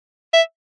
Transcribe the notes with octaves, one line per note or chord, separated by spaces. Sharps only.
E5